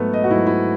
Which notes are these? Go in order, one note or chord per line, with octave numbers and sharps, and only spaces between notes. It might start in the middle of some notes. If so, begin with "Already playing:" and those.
Already playing: G#2 F#3 A3 B3
D#5
F#4
G#2 F#3 E4
E4